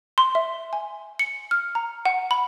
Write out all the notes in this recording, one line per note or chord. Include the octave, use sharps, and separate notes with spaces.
C6
E5
G#5
C#7
F6
A#5
F#5
B5